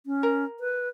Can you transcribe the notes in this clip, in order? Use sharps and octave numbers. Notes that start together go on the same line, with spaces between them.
C#4
A#4
B4